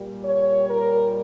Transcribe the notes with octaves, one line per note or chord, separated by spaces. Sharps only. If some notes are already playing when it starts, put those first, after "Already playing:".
Already playing: A#2 G3
C#5
A#4